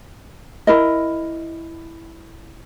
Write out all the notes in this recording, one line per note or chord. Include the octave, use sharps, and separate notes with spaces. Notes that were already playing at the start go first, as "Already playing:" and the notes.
E4 A#4 D#5